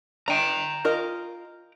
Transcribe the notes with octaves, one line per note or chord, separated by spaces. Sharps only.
D4 G5 A#5
F4 A#4 D#5